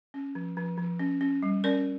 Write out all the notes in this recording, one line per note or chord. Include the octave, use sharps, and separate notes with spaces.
C#4
F3
F3
F3
C#4
C#4
G3
C#4 A#4 D5